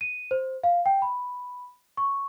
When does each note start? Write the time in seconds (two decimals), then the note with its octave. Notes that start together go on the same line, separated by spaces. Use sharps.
0.01 D#7
0.31 C5
0.64 F5
0.86 G5
1.02 B5
1.97 C#6